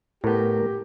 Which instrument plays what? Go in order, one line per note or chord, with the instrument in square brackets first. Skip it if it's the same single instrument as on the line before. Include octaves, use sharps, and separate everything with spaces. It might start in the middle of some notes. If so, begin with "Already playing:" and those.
[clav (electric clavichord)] A2 B3 [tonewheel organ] A3 A#4 [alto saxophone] G4